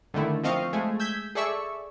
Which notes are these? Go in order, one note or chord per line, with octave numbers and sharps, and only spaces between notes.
D3 D#3 A3 E4
F3 C4 D#5 F5 C#6
G#3 A3 G#4
E6 G6 G#6 B6
G#4 A4 D5 E5 C#6 E6